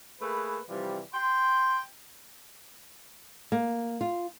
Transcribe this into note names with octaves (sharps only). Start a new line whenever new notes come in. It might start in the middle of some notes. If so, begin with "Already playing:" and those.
A3 A#3 G#4 B4
C3 E3 F3 G3
G5 C6
A#3
F4